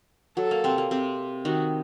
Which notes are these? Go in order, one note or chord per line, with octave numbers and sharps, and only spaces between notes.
F#3 A4
A#3
C3 C4
A#3
C3 C4
D#3 D#4 F#4